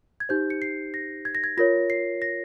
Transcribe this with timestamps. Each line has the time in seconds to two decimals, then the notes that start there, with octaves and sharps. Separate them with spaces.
0.20 G#6
0.29 D#4 G4 C5 G6
0.50 C#7
0.62 C7
0.94 A#6
1.25 G#6
1.35 A#6
1.44 G#6
1.57 F4 A#4 C#5 A#6
1.90 C7
2.22 A#6